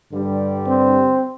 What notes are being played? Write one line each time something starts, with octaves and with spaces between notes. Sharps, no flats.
G2 D3 G3
C4